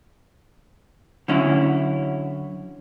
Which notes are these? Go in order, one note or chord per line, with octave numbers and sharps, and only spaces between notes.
D3 F#3 C#4 E4